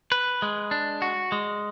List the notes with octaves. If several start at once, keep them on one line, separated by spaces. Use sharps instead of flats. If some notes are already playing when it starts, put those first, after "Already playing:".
B4
G#3
D4
F#4
G#3